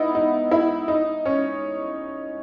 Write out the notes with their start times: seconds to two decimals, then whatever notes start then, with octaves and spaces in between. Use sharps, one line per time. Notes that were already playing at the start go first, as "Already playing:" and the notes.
Already playing: B3 D#4 E4
0.15 D#4
0.51 E4
0.88 D#4
1.25 C#4